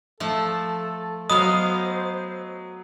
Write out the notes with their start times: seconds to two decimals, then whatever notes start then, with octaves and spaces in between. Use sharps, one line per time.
0.20 F3 A3 A4
1.30 F#3 B3 C5 D#5 F5 D#6